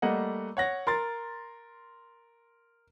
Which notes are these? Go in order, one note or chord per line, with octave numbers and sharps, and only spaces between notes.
G3 A3 A#3 D#5 F#5
C#5 F#5 A#6
A#4 C6 A6